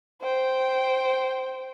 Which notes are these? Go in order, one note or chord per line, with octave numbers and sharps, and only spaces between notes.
C5 G5